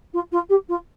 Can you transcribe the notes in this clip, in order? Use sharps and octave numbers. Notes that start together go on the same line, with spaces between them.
F4
F4
G4
F4